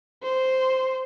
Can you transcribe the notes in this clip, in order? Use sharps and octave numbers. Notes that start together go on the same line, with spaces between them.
C5